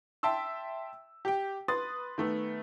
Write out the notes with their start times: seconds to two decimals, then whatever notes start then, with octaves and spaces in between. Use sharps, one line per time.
0.23 E5 G5 A5 C6 E6
1.25 G4 G5
1.68 B4 C6 D#6 A6
2.18 D#3 A3 B3